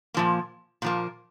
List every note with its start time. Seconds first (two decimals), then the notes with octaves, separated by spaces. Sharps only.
0.14 A#2 F3 A#3
0.82 A#2 F3 A#3